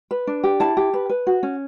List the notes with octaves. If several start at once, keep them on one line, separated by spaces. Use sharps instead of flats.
B4
D4
G4
E4 A5
G4
B4
B4
F#4
C#4